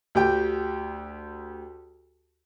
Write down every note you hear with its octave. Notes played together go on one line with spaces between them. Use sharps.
D2 G4 G5